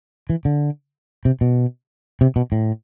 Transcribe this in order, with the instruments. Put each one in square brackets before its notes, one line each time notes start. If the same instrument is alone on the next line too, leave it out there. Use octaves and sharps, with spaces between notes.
[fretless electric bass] E3
D3
C3
B2
C3
B2
A2